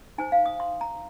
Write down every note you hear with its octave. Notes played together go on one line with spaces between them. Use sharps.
D#4 C5 G#5
F5
D#6
C6
A#5